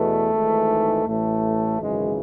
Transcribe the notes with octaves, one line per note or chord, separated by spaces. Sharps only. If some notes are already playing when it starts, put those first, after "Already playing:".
Already playing: E2 B2 A3
G#1 G#2 E3
A1 A2 E3 A3
G#1 F#2 C#3 E3 G#3